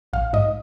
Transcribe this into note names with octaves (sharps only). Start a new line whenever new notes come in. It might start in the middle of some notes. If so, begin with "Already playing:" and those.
A#1 F5
G#2 D#5